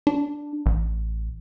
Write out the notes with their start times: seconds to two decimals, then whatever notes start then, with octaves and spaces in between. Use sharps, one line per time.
0.07 D4
0.66 A1